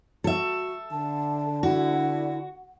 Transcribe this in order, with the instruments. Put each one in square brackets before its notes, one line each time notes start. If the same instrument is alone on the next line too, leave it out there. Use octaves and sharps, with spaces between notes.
[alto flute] F#4 [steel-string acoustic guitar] A4 E5
[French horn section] D3 [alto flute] A5
[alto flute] E4 [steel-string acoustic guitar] F#4